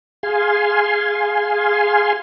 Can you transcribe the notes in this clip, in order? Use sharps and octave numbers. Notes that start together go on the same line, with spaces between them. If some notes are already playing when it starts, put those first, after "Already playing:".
G#4 F5 G#5 C6